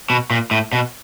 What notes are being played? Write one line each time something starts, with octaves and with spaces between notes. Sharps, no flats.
B2
A#2
A2
B2